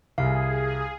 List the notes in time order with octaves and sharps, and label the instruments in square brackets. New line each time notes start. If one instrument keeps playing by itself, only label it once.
[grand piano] C2 [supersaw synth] G#4 [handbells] F5